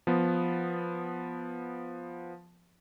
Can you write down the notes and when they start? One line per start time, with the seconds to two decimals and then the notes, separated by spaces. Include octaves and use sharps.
0.07 F3 B3